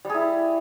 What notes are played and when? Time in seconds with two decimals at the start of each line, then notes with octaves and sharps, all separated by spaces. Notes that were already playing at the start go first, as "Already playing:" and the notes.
0.05 G3
0.10 G#4
0.14 E4